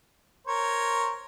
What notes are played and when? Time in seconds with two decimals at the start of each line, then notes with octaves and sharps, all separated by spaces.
0.47 A#4 C5 C#5